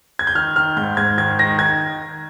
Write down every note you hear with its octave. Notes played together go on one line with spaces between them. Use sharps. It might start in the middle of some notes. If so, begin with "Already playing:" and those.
G#6
G6
D#3 F6
D#3 F6
G#2 G6
G#2 G#6
D#3 G#6
D#3 A#6
D#3 G#6